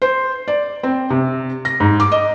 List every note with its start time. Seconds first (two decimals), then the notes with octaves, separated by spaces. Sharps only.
0.02 C5
0.48 D5
0.83 C4
1.10 C3
1.65 A#6
1.80 G#2
2.00 D6
2.12 D#5